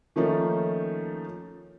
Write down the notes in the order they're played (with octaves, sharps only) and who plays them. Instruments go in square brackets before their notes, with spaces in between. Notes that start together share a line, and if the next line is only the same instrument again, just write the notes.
[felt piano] D#3 F3 A3 A#3 C#4 D#4